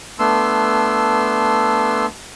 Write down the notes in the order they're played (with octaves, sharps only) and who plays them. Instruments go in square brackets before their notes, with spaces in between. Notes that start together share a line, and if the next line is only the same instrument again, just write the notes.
[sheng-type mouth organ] A3 B3 D4 C6 E6